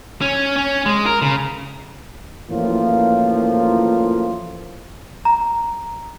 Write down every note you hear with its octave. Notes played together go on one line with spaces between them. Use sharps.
C#4
C#4
G#3
A#4
C#3
F#2 A2 E3 F3 A#3 F4
A#5